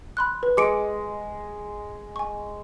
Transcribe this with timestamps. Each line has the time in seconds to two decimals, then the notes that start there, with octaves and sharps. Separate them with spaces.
0.17 B5 C6 F#6
0.43 B4
0.57 G#3 D6 C#7 D7
2.16 G#5 C#6